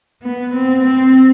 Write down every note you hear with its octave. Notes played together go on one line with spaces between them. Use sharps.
B3
C4
C4